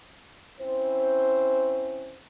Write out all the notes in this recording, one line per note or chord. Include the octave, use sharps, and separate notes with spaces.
C4 C#4 E4 C5